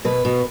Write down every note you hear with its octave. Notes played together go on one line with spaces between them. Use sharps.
B2 B4
B2